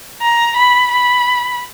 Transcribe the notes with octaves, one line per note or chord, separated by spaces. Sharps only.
A#5
B5
B5